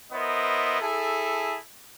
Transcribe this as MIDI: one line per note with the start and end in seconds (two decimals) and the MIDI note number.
0.12 0.78 59
0.12 0.78 64
0.12 0.78 70
0.12 0.78 72
0.12 0.78 75
0.80 1.58 64
0.80 1.58 68
0.80 1.58 69